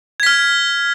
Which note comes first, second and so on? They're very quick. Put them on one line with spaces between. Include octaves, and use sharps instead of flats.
G#6 B6 F6